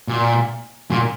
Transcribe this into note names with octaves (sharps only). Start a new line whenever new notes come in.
A#2
A#2